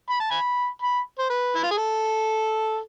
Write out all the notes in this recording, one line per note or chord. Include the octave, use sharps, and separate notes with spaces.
B5
A5
G#5 B5
B5
C5
B4
E4
F4
G#4
A4